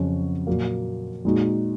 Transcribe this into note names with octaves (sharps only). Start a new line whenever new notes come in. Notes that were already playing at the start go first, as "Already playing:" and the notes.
Already playing: F2 C#3 F#3 C#4 F#4
A#2 F#3 A#3
A#2 G#3 D#4 F#4